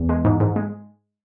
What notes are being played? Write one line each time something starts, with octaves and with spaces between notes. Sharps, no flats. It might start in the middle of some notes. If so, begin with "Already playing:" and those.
Already playing: E2
G#3
G#2
G#2
G#3